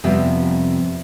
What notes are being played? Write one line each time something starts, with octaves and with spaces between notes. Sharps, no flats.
F2 C3 G3 B3 E5